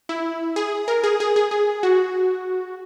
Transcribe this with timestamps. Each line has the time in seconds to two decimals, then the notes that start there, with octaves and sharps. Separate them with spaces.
0.09 E4
0.56 G#4
0.88 A#4
1.04 G#4
1.20 G#4
1.36 G#4
1.51 G#4
1.83 F#4